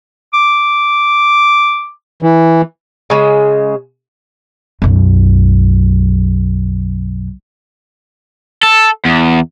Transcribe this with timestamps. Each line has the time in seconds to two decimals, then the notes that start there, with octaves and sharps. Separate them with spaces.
0.34 D6
2.23 E3
3.10 C#3 G#3
4.82 B1 F#2
8.63 A4
9.05 E2